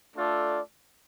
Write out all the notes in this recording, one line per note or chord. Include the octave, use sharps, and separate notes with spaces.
A3 D4 F4 A4 D5